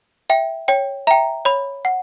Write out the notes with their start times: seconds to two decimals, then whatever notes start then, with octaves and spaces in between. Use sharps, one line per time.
0.30 E5 G5
0.68 C#5 G5
1.07 E5 G5 A#5
1.45 C#5 B5
1.85 F#5